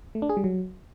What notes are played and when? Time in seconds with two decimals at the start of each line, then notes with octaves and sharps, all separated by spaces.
0.15 A3
0.22 D4
0.29 G#4
0.37 G3
0.44 F#3